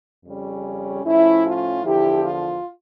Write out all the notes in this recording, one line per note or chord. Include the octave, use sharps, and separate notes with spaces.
F2 C#3 G3 C#4
A2 F3 C#4 E4
F4
E2 D3 F3 E4 G4
F4